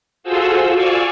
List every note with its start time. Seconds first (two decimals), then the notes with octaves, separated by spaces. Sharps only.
0.23 F4 F#4 G#4 A4 C5 E6
0.74 D5 F5 G#5 C#6 E6